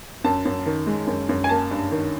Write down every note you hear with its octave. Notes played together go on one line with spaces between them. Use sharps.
F#2 A5
F#2
D#3
G#3
F#2
F#2
G#5
A#3 A5
G2
D#3